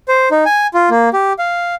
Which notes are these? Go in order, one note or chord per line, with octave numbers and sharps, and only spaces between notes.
C5
D#4
G#5
F4
A#3
G4
F5